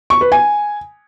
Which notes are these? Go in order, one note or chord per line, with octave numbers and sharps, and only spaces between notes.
C#6
B4
G#5